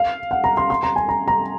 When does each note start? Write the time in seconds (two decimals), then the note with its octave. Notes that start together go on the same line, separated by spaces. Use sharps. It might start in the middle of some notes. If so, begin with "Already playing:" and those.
Already playing: F5
0.31 F#5
0.44 A#5
0.57 C6
0.70 C6
0.83 A#5
0.96 G#5
1.09 A#5
1.28 A#5